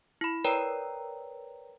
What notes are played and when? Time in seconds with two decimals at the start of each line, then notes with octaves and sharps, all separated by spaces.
0.21 E4 B5
0.45 A#4 B4 C#5 D5 G5 A#5